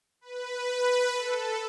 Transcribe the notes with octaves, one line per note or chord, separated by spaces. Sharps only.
B4
A4